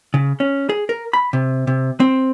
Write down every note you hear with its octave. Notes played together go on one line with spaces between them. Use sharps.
C#3
C#4
G#4
A#4
B5
C3
C3
C4